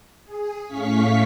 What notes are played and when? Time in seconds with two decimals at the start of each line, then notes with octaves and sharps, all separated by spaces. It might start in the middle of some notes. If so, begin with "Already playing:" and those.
0.24 G#4
0.66 A2 A3 C#4 F5 C#6 B6